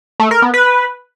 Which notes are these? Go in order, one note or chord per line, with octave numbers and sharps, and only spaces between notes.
A3
A#4
B3
B4